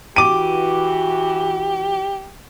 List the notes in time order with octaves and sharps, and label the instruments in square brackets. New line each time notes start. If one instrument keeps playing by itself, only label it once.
[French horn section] E3 F#4 [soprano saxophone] G4 [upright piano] D6 D#7